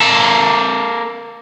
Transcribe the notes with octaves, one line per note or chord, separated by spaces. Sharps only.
A#3 A4